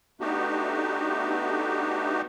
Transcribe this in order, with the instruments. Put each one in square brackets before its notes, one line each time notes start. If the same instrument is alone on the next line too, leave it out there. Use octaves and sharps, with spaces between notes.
[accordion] A3 B3 D4 D#4 F#4 G4